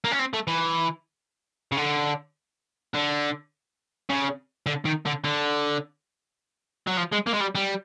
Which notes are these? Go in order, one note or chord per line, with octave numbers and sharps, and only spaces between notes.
A#3
C#4
C4
A3
E3
C#3
D3
D3
C#3
D3
D#3
D3
D3
F#3
F3
G#3
A#3
G#3
G3
G3